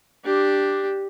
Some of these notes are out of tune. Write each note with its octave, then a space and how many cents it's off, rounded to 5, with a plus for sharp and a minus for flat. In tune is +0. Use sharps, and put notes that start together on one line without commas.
D4 +5 G4 +0